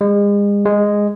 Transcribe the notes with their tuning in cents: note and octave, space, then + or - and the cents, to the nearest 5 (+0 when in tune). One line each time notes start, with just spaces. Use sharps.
G#3 -40
G#3 -10